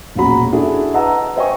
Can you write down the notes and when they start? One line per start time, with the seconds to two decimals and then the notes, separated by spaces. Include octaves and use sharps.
0.16 E1 A#1 C#4 F#4 A#5 B5
0.53 D4 E4 F#4 G#4 A4
0.94 B4 D#5 F#5 A5 A#5 E6
1.36 C5 C#5 D#5 G5 G#5 C#6